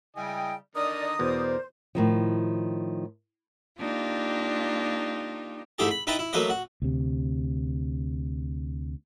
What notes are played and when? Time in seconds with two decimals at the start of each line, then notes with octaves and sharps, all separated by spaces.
0.17 C#3 G3 E4 D#5 G5 G#5
0.75 D3 D#3 A#4 D5 D#5 A#5 D#6
1.19 E2 B2 A#4 C5 D5
1.95 A2 D#3 F3
3.79 A#3 D4 D#4 F4 G4
5.78 G#2 A3 E4 G4 G#4 A5
5.91 B5
6.07 D#4 E4 B4 G5 A5 A#5
6.19 E4
6.33 F#3 A3 A#3 B4 D#5
6.50 F#4
6.82 D2 C3